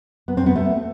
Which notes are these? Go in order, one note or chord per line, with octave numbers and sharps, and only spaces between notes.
B3
C4
B3
A3